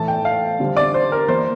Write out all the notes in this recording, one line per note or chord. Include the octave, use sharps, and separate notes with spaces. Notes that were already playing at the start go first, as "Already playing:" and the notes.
Already playing: A2 E3 A3 A5
G5
F5
D3 G3 C4
D5
C5
A#4
E3 A#3 C5